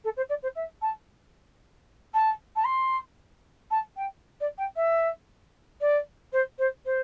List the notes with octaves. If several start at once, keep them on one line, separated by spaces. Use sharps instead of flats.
A4
C5
D5
C5
E5
A5
A5
A5
C6
A5
G5
D5
G5
E5
D5
C5
C5
C5